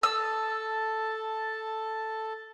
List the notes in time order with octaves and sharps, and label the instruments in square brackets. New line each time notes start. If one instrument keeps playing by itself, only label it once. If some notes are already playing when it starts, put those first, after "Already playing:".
[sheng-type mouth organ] A4 A5 [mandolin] E6